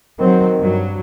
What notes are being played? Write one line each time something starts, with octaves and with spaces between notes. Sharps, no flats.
D#3 F#3 C4
G2 F#3